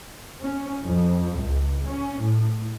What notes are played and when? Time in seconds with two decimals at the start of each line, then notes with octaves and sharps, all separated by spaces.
0.41 C#4
0.84 F2
1.39 C#2
1.86 C#4
2.21 A2